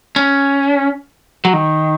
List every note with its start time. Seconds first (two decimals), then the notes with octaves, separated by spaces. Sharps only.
0.16 C#4
1.45 F#3
1.54 D#3